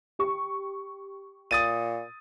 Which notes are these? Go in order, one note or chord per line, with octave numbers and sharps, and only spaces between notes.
G4 C#6
A#2 D#6 A6 D#7